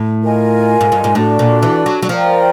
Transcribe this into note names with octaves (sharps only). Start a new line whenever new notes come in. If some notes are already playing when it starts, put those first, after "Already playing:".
Already playing: A2
F4 A#4 D#5 G#5
G#2
G2
G#2
A2 D4 F#4 A4 D5
A#2
E3
F#3
F#3
F3 A#4 D5 G5 A#5